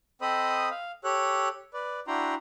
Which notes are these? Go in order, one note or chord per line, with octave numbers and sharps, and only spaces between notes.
C4 A4 C5 D#5 B5 D#6
F5
G4 A4 C#5 F#6
B4 D5
D4 E4 F#4 G5 A#5 C6